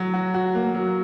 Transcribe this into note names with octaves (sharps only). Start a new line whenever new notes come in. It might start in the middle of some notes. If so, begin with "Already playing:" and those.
Already playing: F#3 F#4
F#4
F#4
A#3
F#3